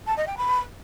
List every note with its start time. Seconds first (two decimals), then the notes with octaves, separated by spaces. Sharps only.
0.06 A5
0.16 D#5
0.27 G5
0.37 B5